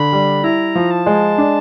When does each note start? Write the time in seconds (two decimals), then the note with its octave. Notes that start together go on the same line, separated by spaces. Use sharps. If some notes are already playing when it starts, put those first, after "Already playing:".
Already playing: D3 B5
0.13 G3
0.44 E4 A#5
0.75 F3
0.91 A5
1.06 G#3
1.38 D4